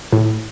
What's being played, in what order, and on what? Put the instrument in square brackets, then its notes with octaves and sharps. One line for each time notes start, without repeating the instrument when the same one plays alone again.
[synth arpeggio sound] A2